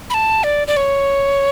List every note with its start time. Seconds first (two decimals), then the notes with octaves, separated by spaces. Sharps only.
0.10 B5
0.14 A5
0.44 D5
0.68 D5
0.77 C#5